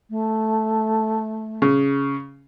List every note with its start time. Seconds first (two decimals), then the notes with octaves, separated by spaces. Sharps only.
0.10 A3
1.62 C#3